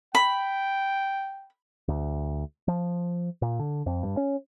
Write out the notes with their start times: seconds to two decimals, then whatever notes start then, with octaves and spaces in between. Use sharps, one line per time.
0.15 G5 B5
1.88 D2
2.68 F3
3.42 A#2
3.59 D3
3.86 F2
4.03 G2
4.17 C#4